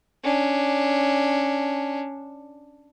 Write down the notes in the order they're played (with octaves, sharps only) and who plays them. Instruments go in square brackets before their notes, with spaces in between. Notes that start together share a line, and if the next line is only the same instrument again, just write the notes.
[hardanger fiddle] C#4 D4